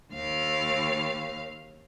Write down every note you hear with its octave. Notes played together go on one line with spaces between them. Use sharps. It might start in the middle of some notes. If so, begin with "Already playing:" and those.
D#2 F5